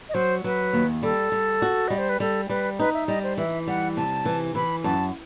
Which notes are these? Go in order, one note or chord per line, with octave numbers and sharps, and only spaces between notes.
D#5
F#3 C5
F#3 B4
D#2
G3 A4
G3
F#4
G3 D#5
C5
B4
G3 A4
G3 B4
D#4 B4
E5
G3 D#5
C5
E3 E5
G3 F#5
C3 A5
E3
E3 B5
F#2 A5